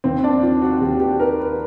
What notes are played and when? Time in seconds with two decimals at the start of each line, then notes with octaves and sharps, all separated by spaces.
0.04 D#2 C4
0.24 D4
0.43 D#3 F4
0.62 F#4
0.81 D#2 G4
1.00 G4
1.19 D#3 A#4
1.39 B4